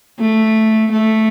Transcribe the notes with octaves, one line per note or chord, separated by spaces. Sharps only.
A3
A3